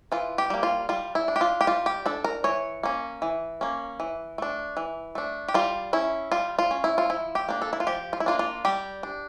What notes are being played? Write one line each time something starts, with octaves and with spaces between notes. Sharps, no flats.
E3 F4
G4
G3 A#3
F4
G3 F4
E4
D4
G4
F4
G4
G3 F4
G4
D4 A4
A#4
E3 C#5
A#3 C#4
E3
A#3 C#4
E3
A3 D4
E3
A3 D4
G4
G3 F4
C#4 E4
G3 F4
F4
C#4
E4
F4
F3 E4
G4
A#3 D4
A4
E4
F4
F3 G4
F4
E4
A#3 D4 F4
F4
G3 G4
D4